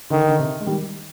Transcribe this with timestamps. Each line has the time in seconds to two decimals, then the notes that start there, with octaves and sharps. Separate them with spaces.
0.10 D3 D#3
0.28 D3
0.39 C3
0.60 G#3
0.66 D#3 G3